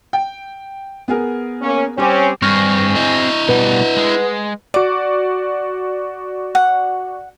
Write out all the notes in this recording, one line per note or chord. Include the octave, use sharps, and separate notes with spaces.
G5
B3 G#4 A#4
A#3 C#4
G3 C4 C#4 D6
G2 C4 G#4 C#6 F6 A#6
E4 D#5
B2 G3 B4 F#5
G#3
F#4 D5 D6
F#5